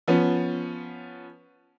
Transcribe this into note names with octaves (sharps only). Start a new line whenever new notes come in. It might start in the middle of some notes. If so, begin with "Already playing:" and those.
F3 B3 C#4